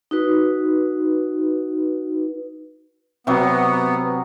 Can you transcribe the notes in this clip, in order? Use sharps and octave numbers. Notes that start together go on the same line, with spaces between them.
D#4 F#4 B4
C3 F#3 B3